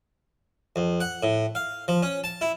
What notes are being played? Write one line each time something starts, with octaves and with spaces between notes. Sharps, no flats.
F2
F#5
A2
F5
F3
C#4
A5
E4